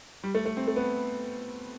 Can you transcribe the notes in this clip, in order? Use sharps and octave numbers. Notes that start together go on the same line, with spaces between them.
G3
A3
A3
C4
A3
B3